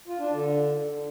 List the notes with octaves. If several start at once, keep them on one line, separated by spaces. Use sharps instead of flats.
F4
D4
D3